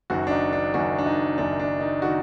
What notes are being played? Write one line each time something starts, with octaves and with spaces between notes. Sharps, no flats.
F#1 F#2 D#3 F#4
D4
D#4
D4
F#1 F#2 D#3 F#4
D4
D#4
F#1 F#2 D#3 D4
D4
D#4
D#3 F#4